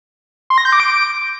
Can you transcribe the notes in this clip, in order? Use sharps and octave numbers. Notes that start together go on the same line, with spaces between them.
C6
A#6
G6
D6
D7